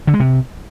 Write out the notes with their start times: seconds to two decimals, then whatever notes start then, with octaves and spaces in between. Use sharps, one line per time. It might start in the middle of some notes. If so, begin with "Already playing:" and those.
0.07 D3
0.14 G#3
0.20 C3